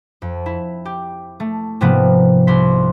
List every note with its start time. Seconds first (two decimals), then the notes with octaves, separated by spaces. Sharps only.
0.22 F2
0.46 E4
0.85 G4
1.40 A3
1.81 G#2 C3 F3 A#3 B3
2.47 C2 C6 B6